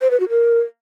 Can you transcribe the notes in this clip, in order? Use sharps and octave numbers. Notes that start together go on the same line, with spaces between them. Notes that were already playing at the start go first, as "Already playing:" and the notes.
C5
B4
F#4
A#4